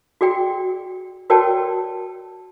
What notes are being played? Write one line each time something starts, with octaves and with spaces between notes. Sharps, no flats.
F#4 G#4 D5 G5
F#4 A#4 C#5 D5 G5 A5